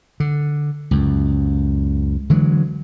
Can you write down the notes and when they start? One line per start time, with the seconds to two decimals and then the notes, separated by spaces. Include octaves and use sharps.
0.20 D3
0.91 C#2 F#2
2.30 D3 E3 F#3 G#3